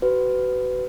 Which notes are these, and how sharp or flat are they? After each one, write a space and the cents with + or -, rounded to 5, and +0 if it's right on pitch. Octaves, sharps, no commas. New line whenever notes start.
F#4 +35 B4 +20